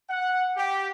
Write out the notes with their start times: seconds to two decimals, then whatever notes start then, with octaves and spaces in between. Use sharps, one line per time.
0.10 F#5
0.57 G4